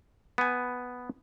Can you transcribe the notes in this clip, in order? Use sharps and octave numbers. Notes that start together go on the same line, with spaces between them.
B3 G#5